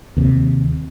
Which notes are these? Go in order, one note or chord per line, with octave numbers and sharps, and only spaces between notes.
D#2 C3